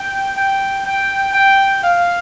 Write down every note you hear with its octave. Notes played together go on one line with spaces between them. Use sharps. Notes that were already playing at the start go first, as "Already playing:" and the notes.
Already playing: G5
G5
G5
G5
F5